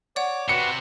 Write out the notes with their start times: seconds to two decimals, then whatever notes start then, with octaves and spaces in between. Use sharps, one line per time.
0.16 C#5 D5 F#5 D6
0.49 C3 F#4 B4 C#7